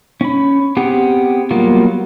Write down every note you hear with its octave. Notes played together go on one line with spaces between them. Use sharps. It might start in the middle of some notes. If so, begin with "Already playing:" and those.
C#4 B5
B3 C4 G4 G#4 F#5
F#3 G3 A#3 B3 F4